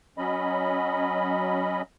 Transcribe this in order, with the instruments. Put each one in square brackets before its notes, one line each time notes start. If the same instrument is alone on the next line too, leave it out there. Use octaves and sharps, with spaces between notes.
[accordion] F#3 C#4 D#5 B5